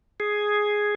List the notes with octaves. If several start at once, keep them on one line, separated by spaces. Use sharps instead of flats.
G#4